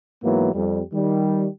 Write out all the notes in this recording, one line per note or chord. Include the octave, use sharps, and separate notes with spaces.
G#2 E3 F#3 A#3 B3
F2 G3
D#3 G3